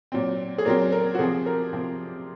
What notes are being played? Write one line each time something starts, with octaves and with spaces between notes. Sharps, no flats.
A#2 F#3 C4
G#4
A#2 F#3 C4 A#4
A#4
F#4
C3 F3 C4 G#4
A#4
C3 F3 C4